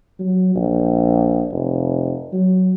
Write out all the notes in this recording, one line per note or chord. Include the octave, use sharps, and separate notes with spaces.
F#3
A#1
F1
F#3